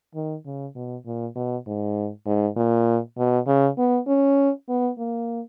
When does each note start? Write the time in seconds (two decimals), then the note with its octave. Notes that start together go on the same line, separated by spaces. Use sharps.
0.15 D#3
0.45 C#3
0.75 B2
1.06 A#2
1.35 B2
1.67 G#2
2.26 G#2
2.56 A#2
3.18 B2
3.47 C#3
3.78 B3
4.07 C#4
4.69 B3
4.98 A#3